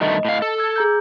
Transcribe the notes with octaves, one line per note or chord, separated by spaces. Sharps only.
G2 D#3 A3 D#5
A2 F5
A4
E6 G#6
G#4 A#5 G6